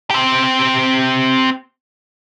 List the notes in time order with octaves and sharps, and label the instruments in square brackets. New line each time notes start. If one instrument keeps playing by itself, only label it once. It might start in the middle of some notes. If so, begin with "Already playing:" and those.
[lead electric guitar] C4 G4